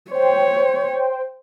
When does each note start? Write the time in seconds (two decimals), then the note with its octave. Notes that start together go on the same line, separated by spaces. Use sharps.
0.11 C5 C#5 G5